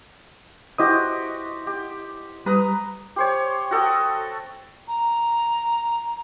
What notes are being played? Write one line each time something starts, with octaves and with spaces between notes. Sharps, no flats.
E4 F#4 G4 C5 D#5 D#6
G4
G3 B4 A#5 D#6
G4 C5 C#5
F#4 A4 D#5 G5
A#5